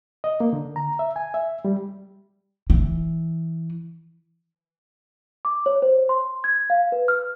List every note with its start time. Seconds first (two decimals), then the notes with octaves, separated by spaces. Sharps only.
0.24 D#5
0.40 A#3
0.53 D3
0.76 A#5
0.99 E5
1.16 G#5
1.34 E5
1.65 G3
2.70 E3
5.45 D6
5.66 C#5
5.82 C5
6.09 C6
6.44 G#6
6.70 F5
6.92 B4
7.08 F6